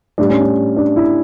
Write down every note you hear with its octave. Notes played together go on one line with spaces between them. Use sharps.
A2 G3 D4
C#4
D4
D4
E4